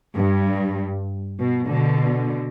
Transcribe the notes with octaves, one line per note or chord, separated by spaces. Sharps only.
G2
B2
B2 D3